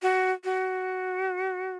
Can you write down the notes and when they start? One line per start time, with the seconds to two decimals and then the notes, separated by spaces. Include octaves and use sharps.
0.02 F#4
0.44 F#4